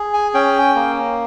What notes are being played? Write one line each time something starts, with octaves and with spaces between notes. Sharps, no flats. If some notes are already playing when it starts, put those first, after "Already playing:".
Already playing: G#4
G#5
C#4 G5
A#3